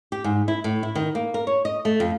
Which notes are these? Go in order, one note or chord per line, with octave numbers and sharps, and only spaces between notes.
G4
G#2
E4
A2
E4
D#3
A#3
A#4
C#5
D#5
A3
F2